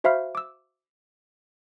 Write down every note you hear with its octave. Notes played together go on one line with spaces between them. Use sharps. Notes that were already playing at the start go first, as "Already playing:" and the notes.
F#4 C5 E5 F5 B5 F6
D6 E6